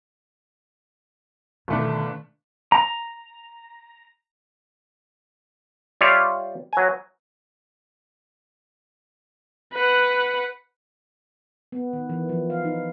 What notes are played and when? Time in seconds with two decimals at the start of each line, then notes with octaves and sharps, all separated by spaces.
1.68 G1 B2 D#3 A3 D4
2.72 A#5
6.01 G3 F4 C#5 D5 E5 F5
6.73 F#3 G#5
9.73 B4 F#5
11.72 B3
11.93 D#3
12.09 E3
12.29 F3
12.50 F5
12.65 D#4